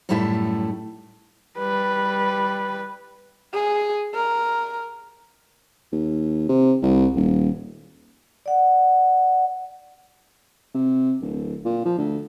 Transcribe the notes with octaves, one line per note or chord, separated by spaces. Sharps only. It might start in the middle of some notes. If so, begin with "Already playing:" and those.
F#2 A2 G3 A3 E4 A5
G3 B4
G#4
A#4
D#2
C3
C2
D#1
D5 F#5
C3
D1
A#2
F3
D2